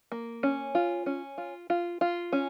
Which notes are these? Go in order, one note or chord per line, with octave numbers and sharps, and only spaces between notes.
A#3
C#4
F4
C#4
F4
F4
F4
C#4